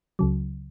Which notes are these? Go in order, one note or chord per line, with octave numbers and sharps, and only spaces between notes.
C#2 C#3 F#3